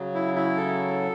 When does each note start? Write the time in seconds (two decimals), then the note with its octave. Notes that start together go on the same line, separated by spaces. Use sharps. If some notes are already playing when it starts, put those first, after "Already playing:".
Already playing: C#3 F#3
0.15 E4
0.35 E4
0.56 A4